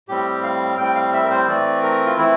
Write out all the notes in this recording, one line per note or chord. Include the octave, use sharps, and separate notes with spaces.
A2 G3 C4 G4
F5
A2 G3 C4 G5
F5
E5
A#4
C5
E3 A3 C4 D5
A#4
F4
E3 A3 C4 E4